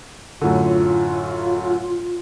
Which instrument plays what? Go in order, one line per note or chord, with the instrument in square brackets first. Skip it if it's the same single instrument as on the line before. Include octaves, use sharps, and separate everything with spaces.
[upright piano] F#2 A2 D3 [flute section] F4